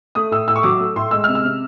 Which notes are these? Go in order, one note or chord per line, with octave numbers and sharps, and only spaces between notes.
A3 D#6
A2 E6
A2 E6
C#6
F#3 D6
A3
A2 C6
G#3 E6
C3 F6
E6
C3